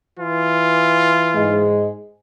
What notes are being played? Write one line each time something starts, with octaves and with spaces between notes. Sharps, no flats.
E3 F4
G#2 G#3